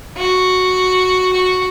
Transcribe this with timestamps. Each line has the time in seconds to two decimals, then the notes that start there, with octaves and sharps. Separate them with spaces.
0.17 F#4
1.33 F#4